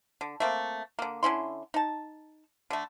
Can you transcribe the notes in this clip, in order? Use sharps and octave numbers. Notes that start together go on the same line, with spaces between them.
D3
A3 A#3 C4
D3 A#3
D3 C#4 E4 C6
D#4 A5
D3 A3